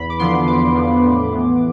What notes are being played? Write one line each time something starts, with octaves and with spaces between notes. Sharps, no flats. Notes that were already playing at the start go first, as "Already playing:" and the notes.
Already playing: E2 B5
D6
D3 F3 B3 C6
E2 D6
D3 F3 B3
A2
E3 B3